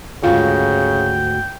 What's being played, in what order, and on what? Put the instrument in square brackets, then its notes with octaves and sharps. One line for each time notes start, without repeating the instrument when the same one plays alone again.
[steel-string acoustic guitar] D2 G#2 F#4 [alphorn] C#3 [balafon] F4 F5 [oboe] G5